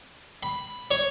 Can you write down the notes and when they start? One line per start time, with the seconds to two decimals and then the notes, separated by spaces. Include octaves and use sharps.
0.43 B5
0.91 C#5